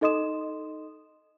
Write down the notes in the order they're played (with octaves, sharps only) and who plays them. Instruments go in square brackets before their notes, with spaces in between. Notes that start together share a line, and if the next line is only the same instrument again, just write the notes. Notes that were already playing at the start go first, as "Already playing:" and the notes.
[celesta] D#4 A4 D#5 C6 D#6 E7